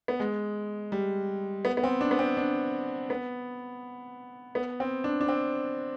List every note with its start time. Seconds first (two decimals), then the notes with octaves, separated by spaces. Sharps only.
0.08 B3
0.20 G#3
0.92 G3
1.65 B3
1.77 B3
1.84 C4
2.01 D4
2.11 B3
2.19 C4
2.37 D4
3.10 B3
4.55 B3
4.80 C4
5.04 D4
5.21 D4
5.28 C4